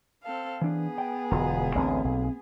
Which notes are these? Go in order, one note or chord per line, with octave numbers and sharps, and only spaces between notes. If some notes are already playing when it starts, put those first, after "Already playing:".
C4 A4 F5
E3 B3 D4 G#4
G5
E1 D2 F4 A#5
A1 D2 D3 A#3 C4
B1